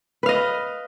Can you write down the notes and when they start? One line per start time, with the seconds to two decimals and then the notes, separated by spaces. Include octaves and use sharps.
0.23 B4
0.26 F5
0.29 D#5